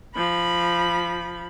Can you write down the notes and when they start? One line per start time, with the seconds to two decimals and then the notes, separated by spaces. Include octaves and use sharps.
0.15 F3 B5